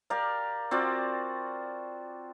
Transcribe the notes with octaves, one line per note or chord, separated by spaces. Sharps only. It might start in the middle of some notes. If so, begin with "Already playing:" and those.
G4 A#4 D5 F5
C4 F4 F#4 D5